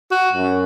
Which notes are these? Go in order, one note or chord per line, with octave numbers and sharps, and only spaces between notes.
F#4
F#2